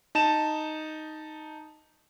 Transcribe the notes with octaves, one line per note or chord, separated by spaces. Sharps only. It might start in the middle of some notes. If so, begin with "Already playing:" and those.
D#4 A5 E7